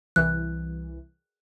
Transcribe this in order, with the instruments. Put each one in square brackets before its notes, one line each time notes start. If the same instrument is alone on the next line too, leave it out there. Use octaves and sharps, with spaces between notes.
[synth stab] C2 E3 [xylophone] F#6